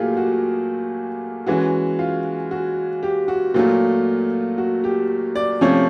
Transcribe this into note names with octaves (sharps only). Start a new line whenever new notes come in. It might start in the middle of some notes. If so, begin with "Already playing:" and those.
Already playing: A#2 F#3 A3 F4 G4 G#4
F#4
E3 G#3 C#4 F#4
F4
F#4
G4
F#4
A#2 F#3 A3 F4
F#4
G4
D5
C3 F3 A3 C#4 C#5